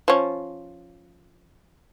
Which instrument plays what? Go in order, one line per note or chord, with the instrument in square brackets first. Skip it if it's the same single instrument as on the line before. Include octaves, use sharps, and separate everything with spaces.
[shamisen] F3 C#4